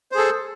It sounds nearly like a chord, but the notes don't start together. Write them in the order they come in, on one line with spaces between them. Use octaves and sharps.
C5 G#4 A4